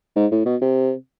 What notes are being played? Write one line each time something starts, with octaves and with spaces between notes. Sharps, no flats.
G#2
A2
B2
C3